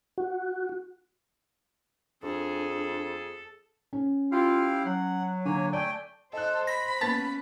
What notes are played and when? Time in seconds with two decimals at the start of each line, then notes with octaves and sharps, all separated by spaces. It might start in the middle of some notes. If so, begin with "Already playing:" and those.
0.18 F#4
2.23 F2 D4 G#4 A4
3.93 C#4
4.32 E4 F4 G4 F5
4.86 F#3 F#5
5.45 D3 A#3 C#5 G#5
5.73 A3 D5 G5 G#5
6.33 A4 C5 D#5 F#6
6.67 B5 A#6
7.01 A#3 B3 C#4 A5 A6